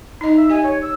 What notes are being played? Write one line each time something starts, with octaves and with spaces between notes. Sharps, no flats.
D#4 D#5 A#5
E5
G4 D#5 G#5
C#5
E6